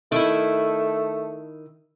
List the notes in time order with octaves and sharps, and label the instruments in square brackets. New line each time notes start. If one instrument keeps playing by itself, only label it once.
[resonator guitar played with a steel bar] D#3 E4 [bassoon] A3